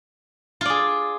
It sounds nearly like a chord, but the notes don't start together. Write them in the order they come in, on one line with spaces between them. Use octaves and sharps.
F4 D5 G#4